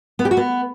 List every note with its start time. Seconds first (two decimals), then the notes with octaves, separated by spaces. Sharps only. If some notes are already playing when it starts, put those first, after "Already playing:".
0.19 B3
0.25 G4
0.31 F#4
0.37 B3